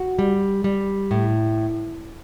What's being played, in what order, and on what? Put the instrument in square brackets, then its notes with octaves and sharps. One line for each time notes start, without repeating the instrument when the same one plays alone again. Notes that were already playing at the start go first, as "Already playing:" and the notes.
Already playing: [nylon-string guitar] F#4
G3
G3
A2